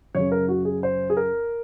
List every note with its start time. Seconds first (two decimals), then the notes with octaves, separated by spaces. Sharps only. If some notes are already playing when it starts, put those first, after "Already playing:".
0.15 F#2 C#3 C#5
0.32 A#4
0.48 F#4
0.65 G#4
0.83 C5
1.10 G#4
1.17 A#4